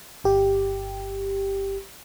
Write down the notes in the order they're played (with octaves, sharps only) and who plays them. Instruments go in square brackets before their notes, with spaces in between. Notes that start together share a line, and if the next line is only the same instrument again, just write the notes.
[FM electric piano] G1 G4